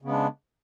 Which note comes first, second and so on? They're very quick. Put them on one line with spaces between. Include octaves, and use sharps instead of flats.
C#3 B3 G#3 D4